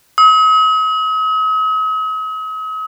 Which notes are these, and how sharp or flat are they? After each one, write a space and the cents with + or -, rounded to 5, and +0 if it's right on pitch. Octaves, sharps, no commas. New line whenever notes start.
D#6 +45